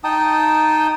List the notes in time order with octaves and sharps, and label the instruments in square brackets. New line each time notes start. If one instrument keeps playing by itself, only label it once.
[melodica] D#4 G5 A5 D#6